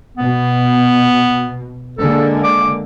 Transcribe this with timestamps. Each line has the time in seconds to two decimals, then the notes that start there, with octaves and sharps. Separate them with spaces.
0.17 B2 B3
1.98 D3 G#3 A#3 A4
2.44 D6